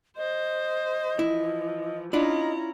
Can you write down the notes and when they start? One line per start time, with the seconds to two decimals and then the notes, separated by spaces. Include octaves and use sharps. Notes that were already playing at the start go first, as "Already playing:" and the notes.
0.17 C5 D#5
1.19 E3 F3 E4
2.13 C#4 D4 E4 F4 D#5 A#5